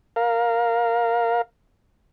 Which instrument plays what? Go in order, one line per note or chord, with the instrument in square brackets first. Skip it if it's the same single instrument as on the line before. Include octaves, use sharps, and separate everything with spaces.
[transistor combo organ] A#4 F5